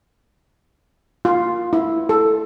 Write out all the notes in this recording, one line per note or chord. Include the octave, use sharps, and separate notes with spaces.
F4
E4
A4